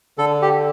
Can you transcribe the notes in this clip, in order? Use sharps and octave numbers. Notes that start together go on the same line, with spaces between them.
D3 A4
G4